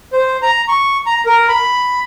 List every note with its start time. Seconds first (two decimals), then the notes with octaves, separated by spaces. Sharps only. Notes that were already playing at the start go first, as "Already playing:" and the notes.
0.13 C5
0.43 A#5
0.68 C#6
1.06 A#5
1.26 A#4
1.49 B5